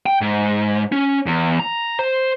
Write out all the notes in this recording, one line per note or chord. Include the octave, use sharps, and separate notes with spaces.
G5
G#2
C#4
E2
A#5
C5